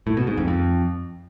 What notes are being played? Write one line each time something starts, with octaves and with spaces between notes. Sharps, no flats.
A2
B2
G#2
F2
F2